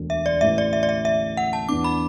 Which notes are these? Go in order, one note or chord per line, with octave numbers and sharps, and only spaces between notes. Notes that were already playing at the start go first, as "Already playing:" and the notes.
Already playing: E1 D2 D3
E5
D5
A1 A2 E3 E5
D5
E5
D5
E5
E5
F#5
A5
E2 E3 B3 D4 D6
B5